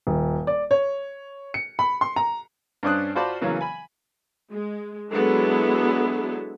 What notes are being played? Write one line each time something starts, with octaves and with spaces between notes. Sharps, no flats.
D#1
D5
C#5
C#7
B5
C6
A#5
G2 C#4 D4 C5 D#6 F#6
F4 F#4 C5 D5 A5 B5
C#3 E3 F#3 A#3 B3 C#4
G#5 B5
G#3
F#3 G#3 B3 D4 E4 A4